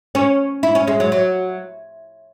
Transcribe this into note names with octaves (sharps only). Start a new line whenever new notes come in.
C#4
E4
C#4
G#3
F#3
F#3